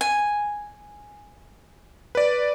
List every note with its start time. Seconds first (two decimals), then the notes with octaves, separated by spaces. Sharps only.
0.01 G#5
2.15 B4 D5